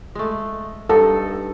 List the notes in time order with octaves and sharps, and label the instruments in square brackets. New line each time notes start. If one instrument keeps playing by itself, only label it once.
[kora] G#3 A3
[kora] G2 D#4 [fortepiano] A4